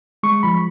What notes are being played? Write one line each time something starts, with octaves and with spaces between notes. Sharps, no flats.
G#3 C#6
F3 B5